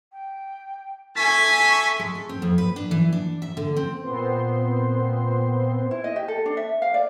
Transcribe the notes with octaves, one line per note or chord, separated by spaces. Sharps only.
G5
A4 E5 G#5 C#6 B6
G#3
A4
C4
F2
B4
D4
E3
D4
E5
D3
C4
A#2 B3 C4 C5 C6
E4
D#5
G4
A4
D4
E5
F5
D5